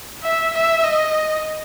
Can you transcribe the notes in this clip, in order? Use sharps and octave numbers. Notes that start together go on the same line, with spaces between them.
E5
E5
D#5